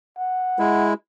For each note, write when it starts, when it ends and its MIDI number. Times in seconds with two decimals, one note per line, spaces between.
0.18 0.87 78
0.59 0.94 56
0.59 0.94 64